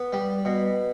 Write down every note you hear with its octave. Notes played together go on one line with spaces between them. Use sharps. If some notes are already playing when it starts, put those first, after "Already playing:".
Already playing: B3
G3
B2